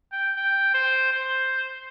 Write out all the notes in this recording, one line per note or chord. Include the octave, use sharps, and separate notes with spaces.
G5
G5
C5
C5